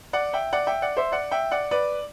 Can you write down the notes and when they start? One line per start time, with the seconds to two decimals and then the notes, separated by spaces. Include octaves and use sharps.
0.13 D5 F#5
0.33 E5 G5
0.53 D5 F#5
0.67 E5 G5
0.82 D5 F#5
0.97 C5 E5
1.12 D5 F#5
1.31 E5 G5
1.51 D5 F#5
1.71 B4 D5